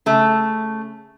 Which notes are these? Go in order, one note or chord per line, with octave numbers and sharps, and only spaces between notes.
C#3 A3